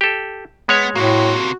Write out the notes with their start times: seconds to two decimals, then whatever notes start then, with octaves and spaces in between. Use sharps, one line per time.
0.01 G4 A4
0.69 G#3 B3 C#5
0.95 A2 C3 A#3 F#4